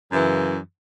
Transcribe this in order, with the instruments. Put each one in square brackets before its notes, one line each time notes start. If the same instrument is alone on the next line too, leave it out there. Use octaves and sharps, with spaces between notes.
[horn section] F#2 C#3 E3